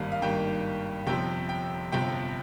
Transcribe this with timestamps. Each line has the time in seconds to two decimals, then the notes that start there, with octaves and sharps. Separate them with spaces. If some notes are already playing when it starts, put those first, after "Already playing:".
Already playing: G#1 G2 D#3 G3 A#3 F5
0.12 F5
0.22 G#1 G2 D#3 G3 A#3 G5
1.07 G1 F2 C3 F3 G5
1.49 G5
1.92 G1 F2 C3 F3 G5